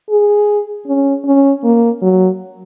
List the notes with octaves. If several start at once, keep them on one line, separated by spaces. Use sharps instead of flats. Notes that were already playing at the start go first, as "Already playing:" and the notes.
G#4
C#4
C#4
A#3
F#3